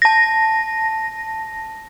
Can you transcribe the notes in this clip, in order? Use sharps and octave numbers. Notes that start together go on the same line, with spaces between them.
A5 A#6